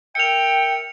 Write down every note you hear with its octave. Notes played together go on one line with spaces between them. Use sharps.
A#4 E5 G5 C#7 F7